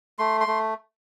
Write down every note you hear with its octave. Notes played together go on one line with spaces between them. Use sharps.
A3 C6
C6
A3